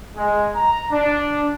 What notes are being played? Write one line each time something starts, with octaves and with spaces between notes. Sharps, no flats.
G#3
A#5
D4